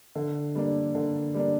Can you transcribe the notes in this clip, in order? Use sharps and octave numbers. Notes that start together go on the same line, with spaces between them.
D3
G3 A#3 D4
D3
G3 A#3 D4